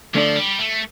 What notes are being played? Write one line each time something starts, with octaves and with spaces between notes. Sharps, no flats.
D3 F3 A3 D4 A4 D5
G3
A3